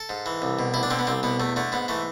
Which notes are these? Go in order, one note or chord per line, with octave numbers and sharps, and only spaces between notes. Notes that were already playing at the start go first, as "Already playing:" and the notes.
Already playing: A4
G#2
E3
C2
B2
D2 E4
D4
D3 C4
B3
C2 C4
B2 B3
E2 A3
D3 A3
G#2 B3
E3 A3